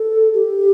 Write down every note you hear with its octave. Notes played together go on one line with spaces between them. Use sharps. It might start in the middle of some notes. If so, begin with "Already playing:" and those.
Already playing: A4
G4